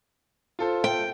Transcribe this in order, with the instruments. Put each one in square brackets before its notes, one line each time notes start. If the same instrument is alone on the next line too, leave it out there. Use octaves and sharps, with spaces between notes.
[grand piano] F4 A4 C5
[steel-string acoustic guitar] G5